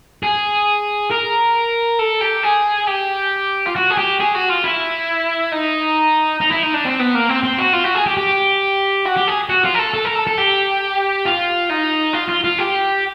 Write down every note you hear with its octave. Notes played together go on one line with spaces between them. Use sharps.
G#4
A#4
A4
G4
G#4
G4
F4
F#4
G#4
G4
G#4
F#4
F4
E4
D#4
D#4
E4
D#4
D4
C4
B3
A#3
C4
C4
F#4
F4
F#4
G#4
G4
G4
F#4
G4
G#4
F#4
F4
A#4
A4
A4
A#4
A4
A4
G4
F4
D#4
F4
F4
F4
G4